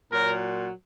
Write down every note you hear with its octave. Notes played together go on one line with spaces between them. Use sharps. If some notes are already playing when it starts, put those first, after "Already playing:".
A#2 F#3 A#4